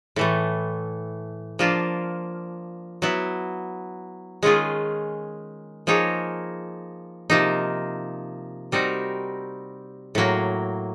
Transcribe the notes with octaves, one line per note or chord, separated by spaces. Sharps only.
A2 E3 A3
F3 A#3 D4 F4
F#3 B3 E4
D#3 G#3 C#4 F4 G#4
F3 A#3 D#4 G#4 C#5
C3 F3 A#3 D#4
G3 C4 D#4 F#4 A#4
A2 F#3 A#3